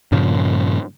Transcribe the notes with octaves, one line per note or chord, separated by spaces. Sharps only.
G2 A#2 C#3 F3